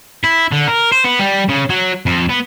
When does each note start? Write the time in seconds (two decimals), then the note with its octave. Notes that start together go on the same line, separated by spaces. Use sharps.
0.24 E4
0.52 D3
0.67 A#4
0.92 C5
1.04 B3
1.19 G3
1.49 C#3
1.70 F#3
2.06 F2
2.29 B3